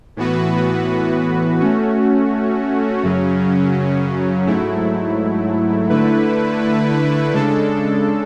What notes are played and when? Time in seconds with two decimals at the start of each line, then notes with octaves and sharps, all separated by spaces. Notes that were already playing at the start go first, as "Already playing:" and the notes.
0.17 A2 E3 B3 F#4 B4
1.60 A3 C#4 F#4
3.03 F#2 C#3 F#3 C#4
4.47 G#2 F#3 A3 E4
5.89 D3 A3 E4 B4
7.33 C#3 G#3 D4 A4